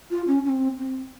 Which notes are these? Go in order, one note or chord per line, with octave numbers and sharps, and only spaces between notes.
F4
C#4
C#4
C4
C4